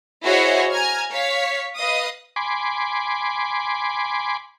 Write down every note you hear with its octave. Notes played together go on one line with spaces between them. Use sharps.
E4 F#4 G#4 C5 C#5 D#5
G#5 A#5 F6 G#6
C#5 F5 C#6 B6
B4 D#5 F5 D#6
G#5 B5 C6 D6